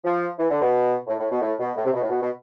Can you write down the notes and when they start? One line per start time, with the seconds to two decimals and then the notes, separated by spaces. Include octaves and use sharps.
0.04 F3
0.38 E3
0.50 D3
0.61 B2
1.07 A2
1.18 A2
1.31 B2
1.41 A2
1.59 B2
1.76 A2
1.84 C3
1.93 B2
2.01 A2
2.10 B2
2.21 B2